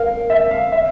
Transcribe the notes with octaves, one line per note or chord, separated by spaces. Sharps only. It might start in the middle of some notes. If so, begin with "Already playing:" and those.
Already playing: A#4 F5
E5
F5
E5